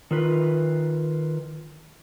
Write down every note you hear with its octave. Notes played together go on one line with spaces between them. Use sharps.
D#3 F4 B4